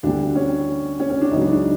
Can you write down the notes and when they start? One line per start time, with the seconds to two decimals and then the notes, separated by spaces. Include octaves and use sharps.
0.03 D2 D3 G3 D4
0.35 C#4
1.00 C#4
1.10 C#4
1.21 D4
1.31 C#2 C#3 F#3 D#4
1.42 D4
1.52 D4